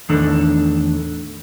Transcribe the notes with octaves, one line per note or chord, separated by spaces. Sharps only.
E2 A2 D#3 D4 A4